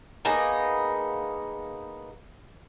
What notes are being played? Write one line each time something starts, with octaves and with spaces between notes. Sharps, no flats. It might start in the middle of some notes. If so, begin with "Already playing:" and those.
A#3 B3 D#4 G#4